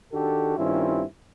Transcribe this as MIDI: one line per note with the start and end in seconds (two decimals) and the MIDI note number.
0.12 0.57 51
0.12 0.57 62
0.12 0.57 66
0.12 0.57 67
0.12 0.57 69
0.58 1.03 43
0.58 1.03 51
0.58 1.03 60
0.58 1.03 61
0.58 1.03 64
0.58 1.03 65